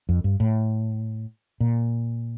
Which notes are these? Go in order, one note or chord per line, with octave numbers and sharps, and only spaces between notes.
F2
G2
A2
A#2